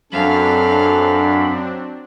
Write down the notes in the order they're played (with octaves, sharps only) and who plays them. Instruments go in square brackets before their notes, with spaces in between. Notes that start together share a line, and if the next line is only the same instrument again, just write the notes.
[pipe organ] F#2 B5 [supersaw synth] F#3 C4 D4 [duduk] A4 [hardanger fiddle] F5